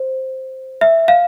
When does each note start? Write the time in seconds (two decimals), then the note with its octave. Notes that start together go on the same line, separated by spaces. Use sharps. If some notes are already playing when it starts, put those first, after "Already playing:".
Already playing: C5
0.81 E5
1.08 F5